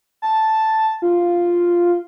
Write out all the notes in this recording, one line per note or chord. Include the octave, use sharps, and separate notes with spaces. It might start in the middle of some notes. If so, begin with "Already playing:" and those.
A5
F4